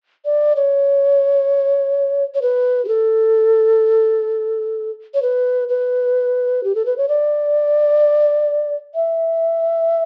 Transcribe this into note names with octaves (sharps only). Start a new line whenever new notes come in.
D5
C#5
C#5
B4
G4
A4
C#5
B4
B4
G4
A4
B4
C#5
D5
E5